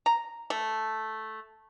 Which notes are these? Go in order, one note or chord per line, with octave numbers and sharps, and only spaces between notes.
A#5
A3